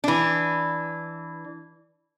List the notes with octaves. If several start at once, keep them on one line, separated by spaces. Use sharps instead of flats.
E3 D4